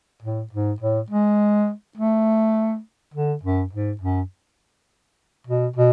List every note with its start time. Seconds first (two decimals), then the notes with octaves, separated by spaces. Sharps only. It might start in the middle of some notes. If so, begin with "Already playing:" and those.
0.23 A2
0.52 G#2
0.80 A2
1.10 G#3
1.97 A3
3.14 D3
3.43 F#2
3.73 G#2
4.01 F#2
5.47 B2
5.76 B2